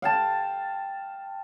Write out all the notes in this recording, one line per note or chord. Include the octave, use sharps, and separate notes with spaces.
F5 G5 A5